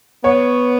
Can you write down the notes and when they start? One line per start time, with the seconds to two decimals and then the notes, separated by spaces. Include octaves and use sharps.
0.24 B3 C#5